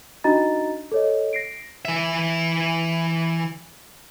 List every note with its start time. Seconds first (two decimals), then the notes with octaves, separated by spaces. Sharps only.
0.24 D4 D#4 F#4 D#5 A#5 A6
0.92 A4 C#5 D#5
1.33 A#6 C7 D7
1.85 E3 E5